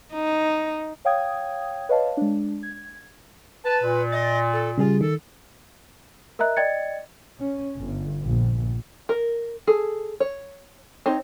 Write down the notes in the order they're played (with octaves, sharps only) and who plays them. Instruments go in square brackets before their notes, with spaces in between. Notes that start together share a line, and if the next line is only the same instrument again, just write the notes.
[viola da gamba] D#4
[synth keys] C#5 F5 G5 D#6 G#6
B4 C#5 D#5 F5 A5
G#3 D4
G#6
[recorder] B4 [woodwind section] A5
[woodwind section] A#2
[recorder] D#5 [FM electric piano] A6
[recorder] A4
[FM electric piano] C#3 G3 G#4 [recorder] F4
[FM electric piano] D#3 [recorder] A4
[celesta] A#4 D#5 E5 A#5 F#6
D5 D#5 G5 G#6 A6 C#7
[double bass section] C#4
G1
A#1
[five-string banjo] A#4
G#4 A4
C#5
C4 D#4 C#5